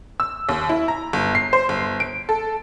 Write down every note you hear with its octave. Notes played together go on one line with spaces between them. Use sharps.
E6
D#2
E4
A#5
G1
C7
C5
G1
D7
A4